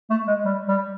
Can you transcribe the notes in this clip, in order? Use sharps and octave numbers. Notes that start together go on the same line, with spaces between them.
A3
G#3
G3
G3